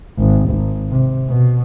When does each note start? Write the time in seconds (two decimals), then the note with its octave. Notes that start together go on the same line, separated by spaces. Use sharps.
0.18 G#1
0.50 G#1
0.91 C3
1.29 B2